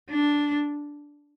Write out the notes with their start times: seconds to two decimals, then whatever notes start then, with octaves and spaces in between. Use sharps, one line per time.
0.10 D4